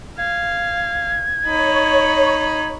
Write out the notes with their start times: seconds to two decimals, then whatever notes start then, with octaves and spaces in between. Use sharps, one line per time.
0.18 F5 G#6
1.46 D#4 C#5 B5